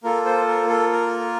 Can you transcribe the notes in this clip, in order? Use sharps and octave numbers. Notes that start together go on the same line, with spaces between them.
A#3 F4 A4 A#4
C5
A#4
A4
A#4